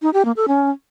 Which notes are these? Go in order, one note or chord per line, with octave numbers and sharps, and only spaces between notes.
D#4
G4
A#3
A4
C#4